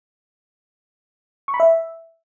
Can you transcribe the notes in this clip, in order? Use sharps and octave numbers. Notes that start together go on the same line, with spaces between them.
C#6
B5
E5